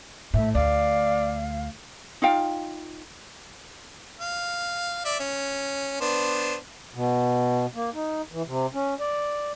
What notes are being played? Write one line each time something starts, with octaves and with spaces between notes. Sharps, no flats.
A2 E5
D2 D5 F5
D#4 F4 F5 G5
F5
D5 E5
C#4
B3 D4 C5
B2
A#3
D#4
E3
C3
C#4
D5